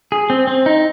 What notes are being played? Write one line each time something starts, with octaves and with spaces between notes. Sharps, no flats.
G#4
C4
C4
D#4